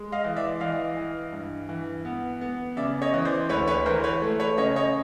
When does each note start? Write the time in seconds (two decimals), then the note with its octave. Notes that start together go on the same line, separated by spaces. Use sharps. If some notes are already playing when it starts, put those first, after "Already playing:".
Already playing: G#3
0.12 D#5 F5
0.24 E3
0.36 D5 E5
0.60 E3 D#5 F5
0.97 E3
1.32 G2
1.69 E3
2.05 B3
2.41 B3
2.77 C#3 D5 E5
3.02 C#5 D#5
3.14 E3
3.25 C5 D5
3.49 D2 B4 C#5
3.67 B4 C#5
3.86 E3 A#4 C5
4.04 B4 C#5
4.22 A3
4.40 B4 C#5
4.58 C#3 C#5 D#5
4.76 C#5 D#5